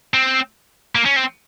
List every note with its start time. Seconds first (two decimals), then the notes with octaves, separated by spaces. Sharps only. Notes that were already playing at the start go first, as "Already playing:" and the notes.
0.14 C4
0.95 A#3
1.06 C#4
1.16 C4